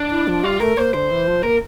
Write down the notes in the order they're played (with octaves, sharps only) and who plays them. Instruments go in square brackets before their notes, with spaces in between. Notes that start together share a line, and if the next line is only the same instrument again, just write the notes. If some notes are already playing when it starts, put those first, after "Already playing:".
Already playing: [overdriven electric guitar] D4
[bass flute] E4
F3
[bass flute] G3 [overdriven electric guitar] F4
[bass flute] A3 [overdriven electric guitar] A#4
[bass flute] A#3 [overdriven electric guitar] C5
[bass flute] D3 [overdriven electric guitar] C5
[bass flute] E3
F3
[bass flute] A#3 [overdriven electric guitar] A#4